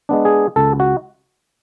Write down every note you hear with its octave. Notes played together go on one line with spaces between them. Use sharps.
G#3 B3 D4
G#4
C#2 A4
F#4